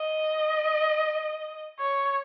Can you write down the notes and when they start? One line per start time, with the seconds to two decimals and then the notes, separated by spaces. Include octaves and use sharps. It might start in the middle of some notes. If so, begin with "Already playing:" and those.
Already playing: D#5
1.80 C#5